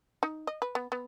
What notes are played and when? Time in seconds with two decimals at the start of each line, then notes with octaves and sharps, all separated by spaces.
0.23 D#4
0.47 D#5
0.62 B4
0.75 B3
0.92 B3